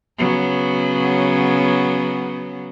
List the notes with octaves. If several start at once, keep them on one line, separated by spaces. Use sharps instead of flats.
C#3 F#3 B3